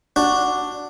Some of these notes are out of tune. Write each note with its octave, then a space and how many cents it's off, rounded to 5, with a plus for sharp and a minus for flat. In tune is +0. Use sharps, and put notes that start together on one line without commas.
D4 +0 F#4 -5